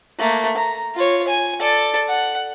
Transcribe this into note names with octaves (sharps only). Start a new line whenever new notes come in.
A3 A#3
A#5
F4 C#5
G#5
A4 D5
F#5